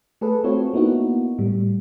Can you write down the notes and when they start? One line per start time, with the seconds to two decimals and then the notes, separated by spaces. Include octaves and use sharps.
0.21 A3 G#4 A4 B4
0.44 A3 C4 F4 F#4 A4 C#5
0.74 A#3 B3 D#4 E4 F#4
1.38 A2 G3